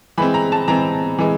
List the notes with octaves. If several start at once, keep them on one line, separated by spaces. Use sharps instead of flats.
E3 G#3 C4 B5
A#5
A5
E3 G#3 C4 A#5
E3 G#3